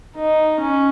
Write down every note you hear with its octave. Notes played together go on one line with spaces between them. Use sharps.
D#4
C#4